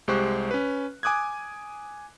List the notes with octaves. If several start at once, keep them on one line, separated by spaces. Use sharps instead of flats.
C2 G#3 G4 C5 C#6 F#6
C#4 B4
G#5 D6 D#6 F#6 G#6